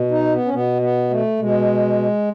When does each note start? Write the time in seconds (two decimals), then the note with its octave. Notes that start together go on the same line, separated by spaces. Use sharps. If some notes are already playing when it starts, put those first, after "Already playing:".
Already playing: B2
0.11 D#4
0.33 B3
0.45 C#4
0.54 B2 B3
0.82 B3
1.11 A3
1.39 B2 G#3